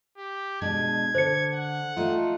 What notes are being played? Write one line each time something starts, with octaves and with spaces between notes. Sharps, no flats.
G4
B2 G#3 D4 G#6
D3 C5 C#7
F#5
A3 D#4 F4